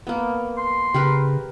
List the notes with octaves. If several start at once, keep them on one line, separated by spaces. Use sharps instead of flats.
A#3 B3
C6
C#3 G4 A#4 B4